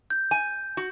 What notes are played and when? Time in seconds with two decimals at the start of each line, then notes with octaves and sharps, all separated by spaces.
0.10 G6
0.31 G#5
0.77 F#4